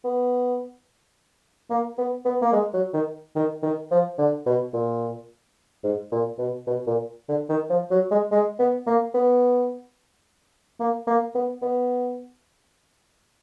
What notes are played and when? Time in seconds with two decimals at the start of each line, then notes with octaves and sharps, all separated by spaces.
0.04 B3
1.70 A#3
1.98 B3
2.25 B3
2.42 A#3
2.53 G#3
2.74 F#3
2.94 D#3
3.35 D#3
3.63 D#3
3.91 F3
4.18 D3
4.46 B2
4.73 A#2
5.84 G#2
6.12 A#2
6.39 B2
6.67 B2
6.87 A#2
7.29 D3
7.49 D#3
7.70 F3
7.91 F#3
8.11 G#3
8.32 G#3
8.59 B3
8.87 A#3
9.14 B3
10.80 A#3
11.07 A#3
11.35 B3
11.62 B3